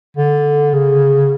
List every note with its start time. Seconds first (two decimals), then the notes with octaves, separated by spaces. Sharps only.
0.17 D3
0.74 C#3